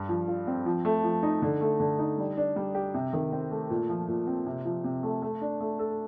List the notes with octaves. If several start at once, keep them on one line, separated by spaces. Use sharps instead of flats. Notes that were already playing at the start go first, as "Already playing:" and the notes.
Already playing: G2
F3
F4
C4
F3
A3
F3
D#4
D3
A3
D3
D#4
G3
D4
G3
G4
C3
D#3
C4
A3
A#2
F3
A#2
C4
C3
F3
C3
A3
A3
D4
A3
A4